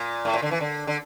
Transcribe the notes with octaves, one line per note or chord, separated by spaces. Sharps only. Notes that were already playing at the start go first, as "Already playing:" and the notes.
Already playing: A#2
A2
A#2
D3
E3
D3
D3